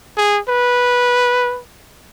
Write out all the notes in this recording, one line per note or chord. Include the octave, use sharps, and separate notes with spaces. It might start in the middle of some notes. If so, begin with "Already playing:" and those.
G#4
B4